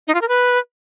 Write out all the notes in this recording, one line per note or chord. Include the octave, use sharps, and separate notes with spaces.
D#4
F4
A#4
B4